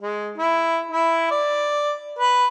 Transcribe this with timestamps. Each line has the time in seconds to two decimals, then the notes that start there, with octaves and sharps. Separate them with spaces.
0.01 G#3
0.38 E4
0.91 E4
1.31 D5
2.19 B4